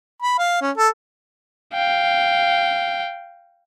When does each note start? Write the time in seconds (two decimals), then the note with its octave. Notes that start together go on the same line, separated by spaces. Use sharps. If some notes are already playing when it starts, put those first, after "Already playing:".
0.22 B5
0.38 F5
0.61 C#4
0.77 A4
1.74 F5 G5